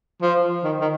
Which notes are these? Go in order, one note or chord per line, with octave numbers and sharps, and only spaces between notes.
F3
D#3
D#3